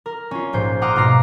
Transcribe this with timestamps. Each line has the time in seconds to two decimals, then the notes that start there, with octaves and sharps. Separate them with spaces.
0.06 A#4
0.31 C#4 F4
0.53 A#1 G#2 C5
0.82 F#5 A#5 C6 D6 D#6 F6
0.96 G#2 B2 F5 A#5 C7